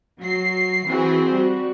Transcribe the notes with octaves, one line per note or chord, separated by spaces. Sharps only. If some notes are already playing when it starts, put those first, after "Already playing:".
F#3 C7
E3 C4 F#4 G#4 C5
G3 F#4